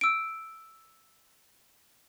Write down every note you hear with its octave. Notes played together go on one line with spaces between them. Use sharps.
E6 D7